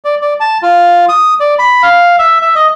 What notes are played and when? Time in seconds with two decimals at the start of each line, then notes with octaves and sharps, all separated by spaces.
0.05 D5
0.22 D5
0.40 A5
0.62 F4
1.09 D#6
1.40 D5
1.59 B5
1.83 F5
2.19 E5
2.42 E5
2.56 D#5